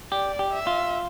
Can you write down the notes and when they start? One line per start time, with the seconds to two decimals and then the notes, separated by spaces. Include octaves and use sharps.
0.12 G4 D5
0.39 G4
0.53 E5
0.67 F4